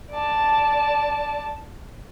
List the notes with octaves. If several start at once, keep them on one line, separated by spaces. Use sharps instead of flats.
D5 A5